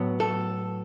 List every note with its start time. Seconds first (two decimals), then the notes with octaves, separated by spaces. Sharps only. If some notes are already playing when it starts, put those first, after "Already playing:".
Already playing: A2 F#3 B3
0.20 A4